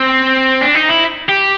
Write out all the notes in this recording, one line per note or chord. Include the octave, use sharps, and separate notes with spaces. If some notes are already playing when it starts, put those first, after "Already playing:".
Already playing: C4
D4
D#4
E4
G4